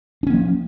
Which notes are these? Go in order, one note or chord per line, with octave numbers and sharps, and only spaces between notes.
F3 A#3 C#4 D4